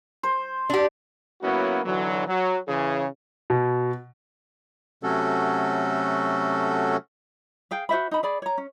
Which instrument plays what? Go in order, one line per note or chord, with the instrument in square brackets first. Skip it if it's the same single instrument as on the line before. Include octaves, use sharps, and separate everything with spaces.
[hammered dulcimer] C5
[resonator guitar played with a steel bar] D4 G4
[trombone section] F#3 A#3 B3 C#4 E4 F#4
B1 D3 E3 F#3
F#3
C#3 E3 G#4
[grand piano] B2
[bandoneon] C3 F#3 A3 C#4 F#4 A4
[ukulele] G#4 F5 G5
F#4 C5 E5 B5
D#4 B5
G#4 D5 B5
C#5 A#5
C#4